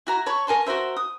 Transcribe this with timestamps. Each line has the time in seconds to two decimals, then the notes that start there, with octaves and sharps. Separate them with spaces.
0.07 E4 F#4 A#5
0.26 C#5 A5 B5 C#6
0.47 A#4 G#5 A5 C6
0.66 F#4 A#4 C5 E5
0.96 D#6